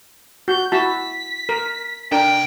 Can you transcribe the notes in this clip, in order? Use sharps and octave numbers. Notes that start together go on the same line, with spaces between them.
F#4 G6
E4 F#4 A5 B6
A#4
C2 D4 A#4 G5